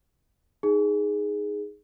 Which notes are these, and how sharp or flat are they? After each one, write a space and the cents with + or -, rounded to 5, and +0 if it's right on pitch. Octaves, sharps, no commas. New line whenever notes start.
D#4 -5 G#4 +0